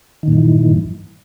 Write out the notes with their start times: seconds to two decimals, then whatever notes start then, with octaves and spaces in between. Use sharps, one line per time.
0.23 D#3
0.28 A#2
0.32 G2
0.37 E3